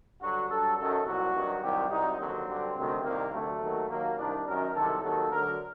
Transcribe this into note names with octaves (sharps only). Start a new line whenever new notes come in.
G2 D3 F#3 F#4
G2 F#3 A4
F#2 D#3 F#3 A4
C2 A#2 F#3 F#4
G2 D#3 F#3
C2 C3 D#3 F#3 G4
C2 C3 F#3 D#4
D#2 D3 F#3 C4
G2 D3 F#3
D2 C3 D#3 F#3
C2 C3 D#3 A#3
D2 C3 F#3 A3
D#2 D#3 F#3
D#2 D#3 F#3 A#3
C2 C3 D#3 D4
F#2 D#3 F#3 A#4
C2 C3 D#3 F#3 A4
D#2 D#3 F#3 A4
D2 D3 F#3 A#4